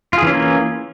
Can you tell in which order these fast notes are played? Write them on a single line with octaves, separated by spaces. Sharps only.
F4 G#4 E3 C#4 A#3